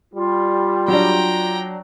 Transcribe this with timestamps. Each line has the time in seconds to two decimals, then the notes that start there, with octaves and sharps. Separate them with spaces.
0.14 G3 F4
0.88 F#3 D4 G5 A#5